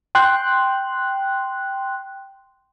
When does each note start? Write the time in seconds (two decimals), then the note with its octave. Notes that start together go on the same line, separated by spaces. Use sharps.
0.15 G5 C6 F#6